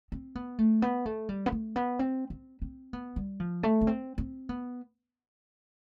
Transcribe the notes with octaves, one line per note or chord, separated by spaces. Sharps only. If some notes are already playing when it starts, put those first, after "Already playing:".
C4
B3
A3
B3
A3
G3
B3
A3
B3
C4
C4
C4
B3
G3
F3
A3
B3
C4
C4
B3